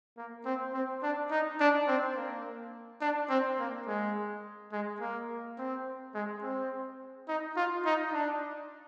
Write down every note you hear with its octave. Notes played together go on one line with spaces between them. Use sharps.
A#3
C4
C4
D4
D#4
D4
C4
A#3
D4
C4
A#3
G#3
G#3
A#3
C4
G#3
C4
D#4
F4
D#4
D4